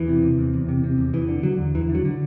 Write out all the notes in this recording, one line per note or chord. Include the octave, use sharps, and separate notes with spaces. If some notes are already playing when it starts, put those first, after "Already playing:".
Already playing: E2 E3
C3
C3
E2
E2
C3
C3
E2
E2 E3
D3
D3 F#3
E2
E2 E3
D3
F#3
D3